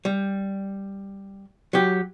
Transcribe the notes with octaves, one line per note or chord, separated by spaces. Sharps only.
G3
F#3 G4